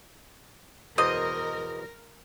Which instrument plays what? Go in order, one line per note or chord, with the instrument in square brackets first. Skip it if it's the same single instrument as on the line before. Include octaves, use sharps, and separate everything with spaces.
[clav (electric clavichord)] E2 B2 C5 [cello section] A#4 [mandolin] D#5